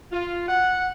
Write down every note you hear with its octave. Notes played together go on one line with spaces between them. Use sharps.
F4
F#5